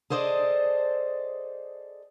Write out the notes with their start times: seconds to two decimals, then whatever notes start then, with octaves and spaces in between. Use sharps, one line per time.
0.10 G#4 A4 C5 D5 D#5